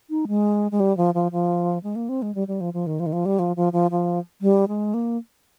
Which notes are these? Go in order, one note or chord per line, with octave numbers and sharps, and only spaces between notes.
D#4
G#3
G#3
G3
F3
F3
F3
G#3
A#3
C4
G#3
G3
G3
F3
F3
D#3
F3
D#3
F3
G3
F3
F3
F3
F3
G3
G#3
A#3